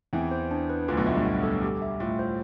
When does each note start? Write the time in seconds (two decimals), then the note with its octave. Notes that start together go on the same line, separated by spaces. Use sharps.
0.13 E2 E3 C4
0.31 C5
0.51 D4
0.69 B4
0.88 D2 D3 F4
0.97 B1 B2
1.07 A2 E5
1.16 G2
1.25 B3
1.43 A4
1.63 G4
1.82 E5
2.00 A2 F4
2.19 C5